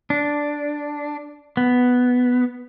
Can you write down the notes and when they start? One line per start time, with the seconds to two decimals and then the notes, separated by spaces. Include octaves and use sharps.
0.10 D4
1.57 B3